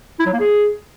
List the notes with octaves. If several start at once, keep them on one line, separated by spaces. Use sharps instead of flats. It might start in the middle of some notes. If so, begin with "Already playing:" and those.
E4
F#3
A#3
G#4